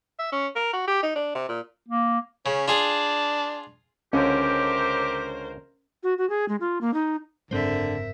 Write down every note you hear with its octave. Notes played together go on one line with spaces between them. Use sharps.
E5
C#4
A#4
F#4
G4
D#4
D4
C3
A#2
A#3
C#3 C#4
D4 F4 G#4
C#2 D3 C#4 G4 A#4 C5
F#4
F#4
G#4
G#3
F4
A#3
D#4
F#1 G#2 D3 G#3 C4 A#4 C5 E5